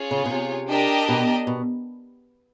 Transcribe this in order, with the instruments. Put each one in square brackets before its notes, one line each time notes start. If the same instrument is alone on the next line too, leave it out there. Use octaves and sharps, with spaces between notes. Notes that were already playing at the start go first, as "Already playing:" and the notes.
Already playing: [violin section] C#4 F4 G#4 C#5
[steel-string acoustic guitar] C#3
B2
C3
[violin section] D4 G4 A#4 D#5
[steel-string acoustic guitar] B2
B2